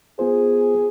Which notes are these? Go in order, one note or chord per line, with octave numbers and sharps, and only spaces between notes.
B3 F4 G#4 C5